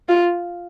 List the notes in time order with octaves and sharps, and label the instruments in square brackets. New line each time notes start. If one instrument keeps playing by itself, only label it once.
[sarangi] F4